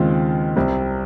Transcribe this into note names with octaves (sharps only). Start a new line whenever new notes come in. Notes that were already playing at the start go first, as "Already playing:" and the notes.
Already playing: D#2 C#3 G#3 C4 F4
C2 C3 G3 C4